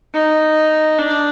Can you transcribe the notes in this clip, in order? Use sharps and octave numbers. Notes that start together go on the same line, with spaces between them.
D#4
D4